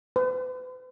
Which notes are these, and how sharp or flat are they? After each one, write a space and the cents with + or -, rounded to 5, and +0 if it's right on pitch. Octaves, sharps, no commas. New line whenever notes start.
B4 +45